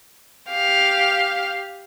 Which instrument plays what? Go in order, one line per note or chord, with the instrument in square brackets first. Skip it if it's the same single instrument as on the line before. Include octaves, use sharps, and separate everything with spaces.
[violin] G4 F5